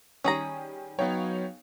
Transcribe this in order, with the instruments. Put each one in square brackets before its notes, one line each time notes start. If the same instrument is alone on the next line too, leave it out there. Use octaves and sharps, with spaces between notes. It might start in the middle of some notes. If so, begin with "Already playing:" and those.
[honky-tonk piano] D#3 G3 [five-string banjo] C#4 G#4 A#5
[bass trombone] F#3 [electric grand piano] B3 D#4 G5 [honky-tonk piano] C#5 F5